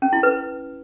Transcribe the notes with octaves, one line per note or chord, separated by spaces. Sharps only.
C#4
E4
B4